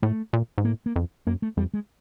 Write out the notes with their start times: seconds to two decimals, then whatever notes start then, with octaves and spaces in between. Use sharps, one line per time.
0.02 A2 A3
0.33 A#2
0.58 G#2
0.65 A2 A#3
0.86 A#3
0.96 F2
1.27 F#2 A#3
1.42 A3
1.57 F2 G3
1.74 G#3